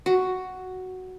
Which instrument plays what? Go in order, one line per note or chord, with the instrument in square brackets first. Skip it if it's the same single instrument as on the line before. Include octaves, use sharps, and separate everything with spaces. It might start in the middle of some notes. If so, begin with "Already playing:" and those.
[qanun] F#4